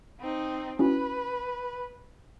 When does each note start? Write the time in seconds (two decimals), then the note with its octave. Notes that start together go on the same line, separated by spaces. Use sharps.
0.20 C4 D#4
0.79 C#4 E4 F#4 B4